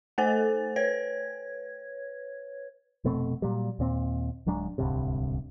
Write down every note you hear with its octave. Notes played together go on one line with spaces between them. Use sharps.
A3 A4 C5 G#5 A6
B4 C#5 G#6
F1 B2 A3 C4
A#2 F#3 G3
D#2 A#2 C4
D1 F#3 G#3 D4
D1 C2 G2 C3